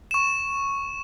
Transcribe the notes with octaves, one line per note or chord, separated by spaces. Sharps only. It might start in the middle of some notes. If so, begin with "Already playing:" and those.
C#6 E7